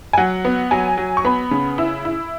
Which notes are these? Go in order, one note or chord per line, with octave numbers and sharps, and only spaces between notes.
G#5
F#3 F#5
B3
F#3 G#5
F#3
C#6
B3 B5
C#3
E4 E6
E4